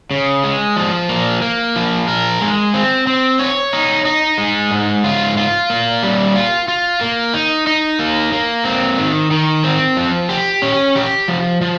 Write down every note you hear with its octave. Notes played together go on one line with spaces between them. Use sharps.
C#3
G#3
F3
A#3
A#3
F3
A#4
G#3
C4
C4
C#5
D#4
D#4
G#3
G#2
F4
F4
A#3
G3
F4
F4
A#3
D#4
D#4
A#3
A#3
C4
D#3
D#3
C4
F3
G4
C#4
G4
F3
F3